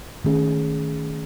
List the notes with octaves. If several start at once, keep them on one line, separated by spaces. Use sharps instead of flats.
D#3 A3 C#4 G#4